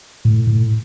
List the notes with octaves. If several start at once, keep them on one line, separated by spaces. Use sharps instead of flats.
A2
A2